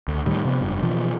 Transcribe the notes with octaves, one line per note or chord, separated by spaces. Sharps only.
D2
A2 D#3 G3
C3 F3 B3
F1 G2
B2 E3 F3